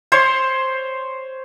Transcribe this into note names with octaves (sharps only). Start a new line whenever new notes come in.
C5 C#5 C6